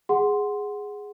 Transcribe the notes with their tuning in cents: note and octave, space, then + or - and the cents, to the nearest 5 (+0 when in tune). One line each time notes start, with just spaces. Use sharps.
G#4 +0 F#5 +0 C6 +0